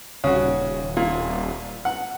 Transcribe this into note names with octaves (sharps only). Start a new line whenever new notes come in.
D#1 C#3 F#4
A#2
F#5